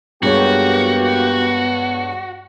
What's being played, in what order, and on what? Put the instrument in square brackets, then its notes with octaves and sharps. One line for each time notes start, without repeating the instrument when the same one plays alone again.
[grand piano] G2 G#3 C#5 [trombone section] A#3 G4 [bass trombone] B3 [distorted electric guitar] F#4